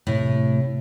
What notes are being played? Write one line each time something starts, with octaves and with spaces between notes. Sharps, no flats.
A2 C3